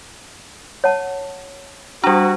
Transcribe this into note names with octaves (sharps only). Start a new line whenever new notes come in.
C#5 F#5 A5
G3 D4 F#4 G4 A#5